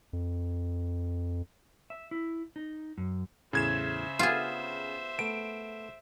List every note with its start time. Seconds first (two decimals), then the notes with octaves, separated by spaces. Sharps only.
0.13 F2
1.90 E5
2.11 E4
2.56 D#4
2.98 F#2
3.53 E2 A2 C#3 C5 E5 G#6 E7
4.19 B3 F4 G4 G#4
5.19 A3 B3 D7